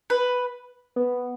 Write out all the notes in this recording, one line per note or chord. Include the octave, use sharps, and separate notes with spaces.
B4
B3